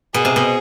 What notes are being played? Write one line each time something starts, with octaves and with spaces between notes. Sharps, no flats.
B2 G#4
C3
B2